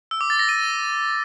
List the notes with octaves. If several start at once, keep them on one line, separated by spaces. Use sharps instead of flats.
E6
D6
A6
A#6
D#7